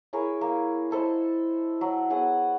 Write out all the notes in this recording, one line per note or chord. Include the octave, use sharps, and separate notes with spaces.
E4 G#4 A#4 C#5
A#3
E4 A4 C5 D#5
F#3
B3 G#4 C#5 F#5